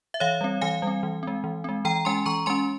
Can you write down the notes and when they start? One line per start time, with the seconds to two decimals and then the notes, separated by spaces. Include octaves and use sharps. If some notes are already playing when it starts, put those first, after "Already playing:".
0.14 E5
0.20 E3 C#5 F5
0.41 G3 C4
0.61 E3 F5 G#5
0.82 G3
0.87 C4
1.03 E3
1.23 G#3 C4
1.44 E3
1.64 G#3 C4
1.85 E3 G5 A#5
2.05 G#3 C#4 G#5 C6
2.26 E3 A#5 C#6
2.46 G#3 C#4 G#5 C6